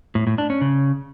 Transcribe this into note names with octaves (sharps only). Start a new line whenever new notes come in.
A2
A2
D4
C#4
C#3